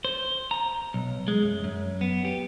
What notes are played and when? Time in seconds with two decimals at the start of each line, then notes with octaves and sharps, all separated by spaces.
0.05 C5
0.51 A#5
0.94 B1
1.28 G#3
1.43 F#2
1.64 F#2
2.01 B3
2.25 G4